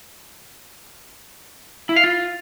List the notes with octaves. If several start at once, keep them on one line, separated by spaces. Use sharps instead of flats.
E4
F5
F4